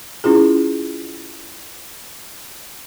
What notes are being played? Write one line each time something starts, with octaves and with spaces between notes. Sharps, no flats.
C#4 E4 F4 G#4